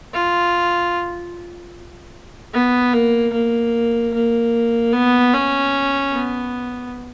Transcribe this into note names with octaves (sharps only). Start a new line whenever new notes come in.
F4
B3
A#3
A#3
A#3
B3
C#4
B3